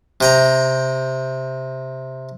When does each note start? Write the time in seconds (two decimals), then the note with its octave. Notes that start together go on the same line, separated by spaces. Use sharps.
0.21 C3 G5 A#5